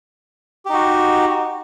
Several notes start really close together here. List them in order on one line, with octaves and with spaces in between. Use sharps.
G4 D#4 F#4